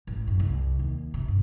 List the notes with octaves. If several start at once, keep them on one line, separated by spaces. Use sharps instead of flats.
A1
F#2
C2
D#2
C3
G2